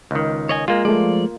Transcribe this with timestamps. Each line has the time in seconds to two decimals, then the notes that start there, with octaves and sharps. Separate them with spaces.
0.11 C#2 D#3
0.49 C#5 D#5 G#5
0.68 G#3 A#3 F4
0.85 F3 G#3 A3 D5